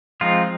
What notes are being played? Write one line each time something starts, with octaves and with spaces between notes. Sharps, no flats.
F3 G#3 C4 D#4 F4